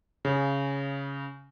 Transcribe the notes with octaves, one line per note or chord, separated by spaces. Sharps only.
C#3